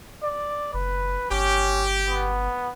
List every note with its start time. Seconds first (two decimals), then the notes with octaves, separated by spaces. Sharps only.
0.23 D5
0.74 F#1 B4
1.30 G1 C#4 G4
2.09 B3